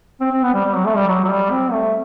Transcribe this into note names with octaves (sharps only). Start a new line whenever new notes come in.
C4
C4
B3
G3
G3
F#3
A3
G3
F#3
F#3
G3
C4
A3